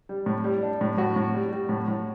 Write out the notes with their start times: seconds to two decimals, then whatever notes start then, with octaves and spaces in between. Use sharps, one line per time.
0.09 G3
0.26 A2
0.44 G3
0.63 D4
0.81 A2
0.98 A2 F#4
1.16 A2
1.34 G3
1.52 G3
1.69 A2
1.88 A2